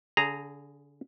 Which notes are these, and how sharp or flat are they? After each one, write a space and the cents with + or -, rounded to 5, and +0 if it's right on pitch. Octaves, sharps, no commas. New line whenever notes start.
D3 -35 G#4 +0 A#5 -10